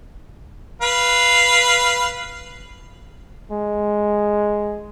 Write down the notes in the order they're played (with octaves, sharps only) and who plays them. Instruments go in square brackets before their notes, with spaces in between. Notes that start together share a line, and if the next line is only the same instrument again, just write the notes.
[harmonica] B4 F5
[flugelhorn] G#3